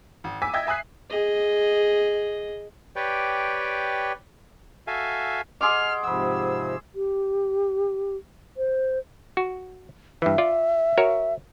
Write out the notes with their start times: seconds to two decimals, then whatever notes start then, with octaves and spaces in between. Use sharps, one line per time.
0.24 G#1
0.42 G#5 D6 E6 B6
0.54 D#5 E5 G5 G#6
0.67 E5 G#5 D#6 F#6 C7
1.10 G#4 D#5
2.96 G4 B4 C#5 D5 G5
4.87 F#4 A4 E5 F5 G#5
5.61 G#4 D#5 F#5 C6 D6 F6
6.04 G#2 C3 F3 F#5 B5 E6
6.95 G4
8.57 C5
9.37 F#4
10.22 G2 E3 E5
10.38 F4 D5
10.98 F#4 A#4 C#5